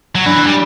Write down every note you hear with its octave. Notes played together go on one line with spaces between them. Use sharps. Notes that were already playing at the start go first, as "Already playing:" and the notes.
F#3
E3 D4
G3